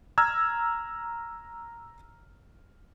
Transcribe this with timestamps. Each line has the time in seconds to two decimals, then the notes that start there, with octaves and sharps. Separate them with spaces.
0.18 A#5 E6 F6 G#6